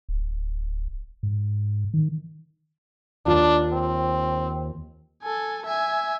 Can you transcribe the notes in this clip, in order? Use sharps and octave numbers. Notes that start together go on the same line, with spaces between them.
D1
G#2
D#3
D#2 D4 F4
C4
A4 G#5
E5 G#5